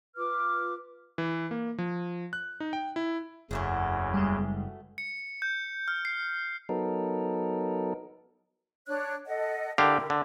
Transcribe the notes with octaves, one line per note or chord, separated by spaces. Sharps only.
F4 B4 D6 F6
E3
A#3
F3
F#6
D#4
G5
E4
F#1 E2 C#3 F#3 A3 B3
G3 G#3
C#7
G6
F6
C7
F#3 B3 D#4 A4 A#4
D4 C#5 F#6
A4 D#5 F#5
D3 E4 G4 A#4 F5 G5
D3